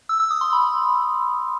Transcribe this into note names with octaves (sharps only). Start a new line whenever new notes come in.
E6
E6
D#6
C6
B5